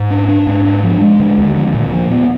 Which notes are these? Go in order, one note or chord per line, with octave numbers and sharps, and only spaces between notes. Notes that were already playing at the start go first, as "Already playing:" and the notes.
Already playing: G#2
D4
D4
G#2
D4
F3
G#3
D3
D#2
F3
A#2
F3
B3